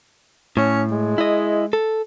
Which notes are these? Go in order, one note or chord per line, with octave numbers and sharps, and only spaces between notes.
A2 C#4
G#3
E4 D#5
A4